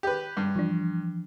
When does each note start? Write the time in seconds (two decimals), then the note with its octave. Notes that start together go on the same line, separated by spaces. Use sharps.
0.03 G4 B4
0.37 G2
0.56 E3 F3 D4